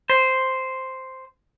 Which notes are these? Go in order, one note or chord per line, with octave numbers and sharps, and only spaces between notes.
C5